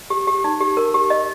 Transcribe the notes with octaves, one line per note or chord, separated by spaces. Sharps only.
G4
G4
D#4
G4
A#4
G4
D#5